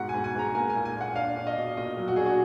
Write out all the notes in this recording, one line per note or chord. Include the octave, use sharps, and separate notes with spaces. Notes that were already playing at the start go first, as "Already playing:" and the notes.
Already playing: G#2 B2 F#5
G#5
G#2
G#5
G#2 A#5
A#3 G#5
G#5
A#2
G#5
A#2 F#5
D4 F5
D4
D#5
B2
A#2 D#5
F#3
F#4
D4 G#4
F#4